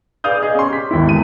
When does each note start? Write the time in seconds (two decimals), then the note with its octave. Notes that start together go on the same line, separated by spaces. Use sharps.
0.24 G#4 B4 D5 F5 D#6 G6
0.42 G#4 D#5
0.55 C#4 C6
0.70 G4 B6
0.91 G#1 D#2 E4
1.09 F1 E2 D#7